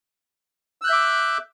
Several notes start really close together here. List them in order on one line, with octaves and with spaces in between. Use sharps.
E6 F#6 G6 E5 D6